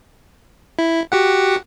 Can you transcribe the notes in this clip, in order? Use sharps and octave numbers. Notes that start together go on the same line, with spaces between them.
E4
F#4 G4 F#5